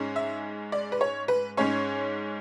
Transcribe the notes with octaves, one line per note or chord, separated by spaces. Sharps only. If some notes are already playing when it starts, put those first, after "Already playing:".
Already playing: G#2 G#3 C#4
E5
D5
B4
C#5
B4
G#2 G#3 C#4 C#5